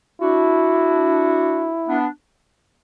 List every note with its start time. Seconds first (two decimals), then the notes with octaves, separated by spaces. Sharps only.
0.21 D4 E4 F#4
1.88 B3 D4